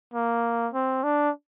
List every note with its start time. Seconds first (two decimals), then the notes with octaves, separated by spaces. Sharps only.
0.14 A#3
0.74 C4
1.04 D4